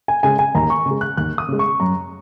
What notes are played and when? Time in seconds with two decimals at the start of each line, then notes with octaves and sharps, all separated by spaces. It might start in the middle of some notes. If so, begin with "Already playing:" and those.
0.08 G#5
0.23 C#3 G#3 G#5
0.39 G#5
0.55 D#2 A#5
0.70 C#6
0.86 C#3
0.91 G#3
1.01 F#6
1.17 D#2 F#6
1.38 D#6
1.48 C#3 G#3
1.59 C#6
1.80 F#2 A#5